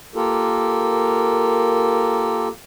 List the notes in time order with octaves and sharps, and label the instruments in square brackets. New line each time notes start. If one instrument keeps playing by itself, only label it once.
[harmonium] A#3 F4 G4 A4 A#4